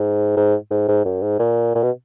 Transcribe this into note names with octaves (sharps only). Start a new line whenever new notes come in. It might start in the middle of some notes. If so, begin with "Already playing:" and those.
Already playing: G#2
G#2
G#2
G#2
F#2
G#2
A#2
A#2
B2